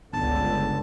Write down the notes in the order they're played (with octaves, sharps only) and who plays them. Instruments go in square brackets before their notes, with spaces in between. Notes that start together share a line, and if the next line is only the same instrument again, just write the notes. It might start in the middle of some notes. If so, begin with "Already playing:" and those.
[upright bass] G1 B3 [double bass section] C#2 D3 [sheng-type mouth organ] A5